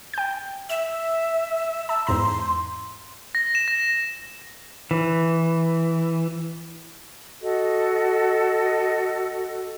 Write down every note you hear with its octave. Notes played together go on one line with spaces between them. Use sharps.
G5 G6
E5 E7
A5 E6
E2 G#2 A#5 C6
A#6
E7
A#6
E3
F#4 A4 D#5